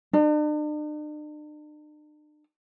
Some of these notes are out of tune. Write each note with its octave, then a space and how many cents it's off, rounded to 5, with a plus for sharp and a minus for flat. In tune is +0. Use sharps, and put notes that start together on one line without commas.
D4 +45